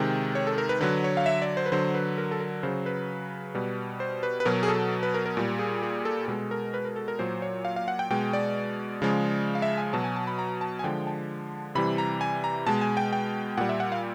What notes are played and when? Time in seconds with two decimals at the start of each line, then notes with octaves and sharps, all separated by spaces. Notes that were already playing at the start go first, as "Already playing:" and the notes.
Already playing: C3 D#3 G#3 G5
0.35 C#5
0.47 A4
0.58 A#4
0.69 B4
0.81 D3 F#3 B4
1.04 C#5
1.17 F5
1.26 E5
1.42 D5
1.57 C5
1.66 B4
1.72 D3 F#3 C5
1.95 B4
2.18 A#4
2.31 A4
2.40 A#4
2.63 C#3 F#3 C5
2.86 B4
3.55 B2 G3
4.00 C5
4.23 B4
4.40 B4
4.45 B2 F#3 A#4
4.63 G#4
4.68 A4
5.03 B4
5.14 A#4
5.26 A#4
5.37 A#2 G3
5.59 G#4
5.83 G#4
6.05 A4
6.28 B2 G#3 A4
6.51 A#4
6.74 B4
6.85 A#4
6.96 A4
7.08 A#4
7.19 A#2 F#3 C5
7.42 C#5
7.65 F5
7.76 F5
7.88 F#5
7.99 G5
8.10 B2 G#3 G5
8.33 D5
9.02 C#3 F3 G#3
9.55 F5
9.62 E5
9.78 G#5
9.93 B2 F#3 A5
10.04 G#5
10.16 A5
10.27 B5
10.39 A#5
10.61 A5
10.79 G#5
10.84 D3 F3 G#3 G5
11.07 A5
11.75 C3 E3 G3 B5
11.98 A#5
12.21 G#5
12.44 A#5
12.67 B2 G#3 A5
12.81 G#5
12.97 G5
13.13 G5
13.57 A#2 G3 F#5
13.69 E5
13.80 F#5
13.92 F5